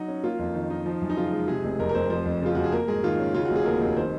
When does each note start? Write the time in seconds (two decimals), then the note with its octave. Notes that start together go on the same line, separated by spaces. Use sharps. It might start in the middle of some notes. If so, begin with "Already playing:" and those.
Already playing: F#3 D#4 F#4
0.08 C#4
0.24 A#3 F4
0.39 F2
0.55 D#3
0.70 D#4
0.86 F3
1.02 F#2
1.10 D#4
1.17 C#3 F4
1.32 G#3
1.48 C3 G#4
1.64 F1
1.79 F2 A#4
1.89 A#4
1.94 F1 C5
2.10 F3 C5
2.25 F2
2.42 C#3 F4
2.55 F2 F#4
2.64 G#4
2.72 A#3 A#4
2.88 G#2 G#4
3.03 D#3 F4
3.19 C#4
3.34 C#3 F4
3.45 F#4
3.51 F1
3.56 G#4
3.66 D#2 A#4
3.81 F1
3.97 D#3 C5